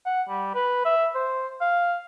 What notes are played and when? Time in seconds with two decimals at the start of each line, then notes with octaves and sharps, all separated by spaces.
0.06 F#5
0.29 G3
0.55 B4
0.85 E5
1.15 C5
1.61 F5